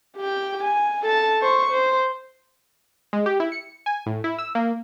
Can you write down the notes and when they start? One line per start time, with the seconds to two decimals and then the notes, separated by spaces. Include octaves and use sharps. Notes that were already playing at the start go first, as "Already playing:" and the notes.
0.17 G4 G5
0.63 G#5
1.03 A4 A5
1.42 C5 C#6
1.70 C5
3.13 G#3
3.26 G4
3.40 E4
3.52 C#7
3.86 G#5
4.06 A2
4.24 E4
4.38 E6
4.55 A#3